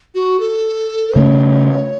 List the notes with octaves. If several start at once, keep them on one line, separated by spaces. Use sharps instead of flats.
F#4
A4
C#3 A3 C#4 C#5